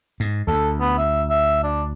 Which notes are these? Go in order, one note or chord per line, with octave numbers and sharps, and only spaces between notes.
G#2
D2 A4
B3
E5
E5
D4